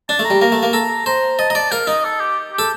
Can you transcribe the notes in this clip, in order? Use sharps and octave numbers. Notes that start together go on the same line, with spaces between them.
D4 A5
A3
A#5
G3
A#3 A#5
A3
A#3
A4 A#5
C5 A#5
D#5 A5
D#5 A#5
D5 A5
A#4 F5
D#4 D#5
A4
G4
G4
A4